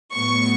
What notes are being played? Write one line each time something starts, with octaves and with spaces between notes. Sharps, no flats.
A2 F#3 B3 C#6